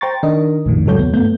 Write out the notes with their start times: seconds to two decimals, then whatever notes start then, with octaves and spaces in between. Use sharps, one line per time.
0.01 C5 G5 A#5 C6 C#6 A6
0.23 D#3 D4 A#4 D#5
0.65 A#1 F2 A2 D#3
0.86 G#2 C#3 F#3 A4 C#5 G6
0.99 D#2 B3
1.13 G2 A3 B3 G6